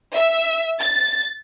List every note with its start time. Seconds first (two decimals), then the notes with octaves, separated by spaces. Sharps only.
0.14 E5
0.80 A6